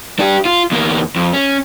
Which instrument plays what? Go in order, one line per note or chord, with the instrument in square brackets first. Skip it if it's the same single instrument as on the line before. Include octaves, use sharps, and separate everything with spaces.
[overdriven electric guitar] D4 G4
F4
E2 A#3
F2
C#4